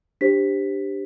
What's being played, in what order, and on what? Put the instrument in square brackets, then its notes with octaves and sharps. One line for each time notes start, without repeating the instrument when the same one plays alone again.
[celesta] D4 G4 C5 B6